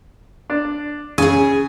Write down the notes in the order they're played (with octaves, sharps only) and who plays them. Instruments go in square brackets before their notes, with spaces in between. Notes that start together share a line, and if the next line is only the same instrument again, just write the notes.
[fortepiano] D4
[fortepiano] C#3 [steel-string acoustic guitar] G#4 G#5